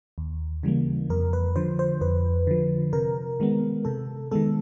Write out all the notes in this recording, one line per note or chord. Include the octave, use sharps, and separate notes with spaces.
D#2
C#3 E3 G3 A#3
F2 A#4
B4
D3 F3 C5
C5
F2 B4
D3 F3
C3 A#4
D#3 G#3 B3
C3 A4
D#3 G#3 B3 A4